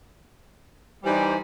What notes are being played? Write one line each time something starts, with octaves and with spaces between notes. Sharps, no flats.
E3 G3 D#4 C5 G#5